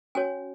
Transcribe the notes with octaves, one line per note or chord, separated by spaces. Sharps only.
C#4 F#4 C#5 G#5